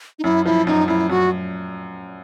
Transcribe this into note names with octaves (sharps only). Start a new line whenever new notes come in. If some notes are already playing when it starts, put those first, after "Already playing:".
D#4
F#2 E4
F3 E4
F#2 D#4
F#2 E4
F#2 F#4